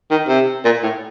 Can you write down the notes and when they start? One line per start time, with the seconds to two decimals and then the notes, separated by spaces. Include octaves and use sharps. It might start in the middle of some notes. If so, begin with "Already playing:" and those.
0.11 D#3
0.28 C3
0.65 A#2
0.83 A2